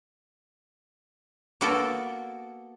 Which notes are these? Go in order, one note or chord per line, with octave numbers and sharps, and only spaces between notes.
A#3 B3 F#4 A4 A#4